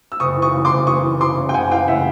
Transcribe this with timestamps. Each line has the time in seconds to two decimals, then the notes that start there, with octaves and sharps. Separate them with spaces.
0.12 E6
0.20 F#1 C#6 D#6
0.37 E3
0.42 C#6 D#6
0.53 C#3
0.65 C6 D6
0.71 F#1
0.87 E3 C#6 D#6
1.04 E3
1.21 F#1 C6 D6
1.37 C#3
1.49 G5
1.54 F#1 F#5 G#5
1.71 E3 F5 G5
1.88 C#3 E5 F#5